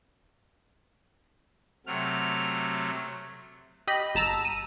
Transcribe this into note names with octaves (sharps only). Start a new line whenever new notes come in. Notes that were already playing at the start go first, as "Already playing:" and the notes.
C3 F#3 A3 F6
G4 D#5 B5
G1 A5 A#5 E6
D#7